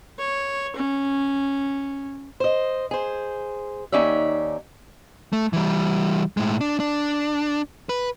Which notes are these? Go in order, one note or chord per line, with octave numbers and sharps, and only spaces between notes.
C#5
C#4
C5 D#5
G#4 C5
D#2 C#4 D#4 D5 E5
A3
E3 G3
A2 G#3
D4
D4
B4